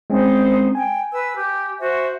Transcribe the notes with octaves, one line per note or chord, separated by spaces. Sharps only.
G#3 C4 C#4 D#4 C5
G5 G#5
B4 E6
G4
F#4 C5 E5